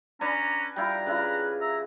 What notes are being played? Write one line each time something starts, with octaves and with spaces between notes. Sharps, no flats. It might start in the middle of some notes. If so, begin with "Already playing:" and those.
C#4 D4 B4 G#5 A#5
G3 E4 F4 G5 A#5
C#3 E4 F4 B4
E5 A#5